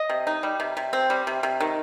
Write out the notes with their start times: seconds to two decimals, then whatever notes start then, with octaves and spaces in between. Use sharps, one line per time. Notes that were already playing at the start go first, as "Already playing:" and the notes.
Already playing: D#5
0.09 C3
0.27 D#4
0.43 G3
0.60 C3
0.77 C3
0.93 C4
1.10 G3
1.27 C3
1.43 C3
1.60 D#3